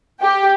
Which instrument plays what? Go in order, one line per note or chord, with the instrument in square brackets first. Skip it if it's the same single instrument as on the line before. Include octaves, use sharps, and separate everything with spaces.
[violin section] G4 G5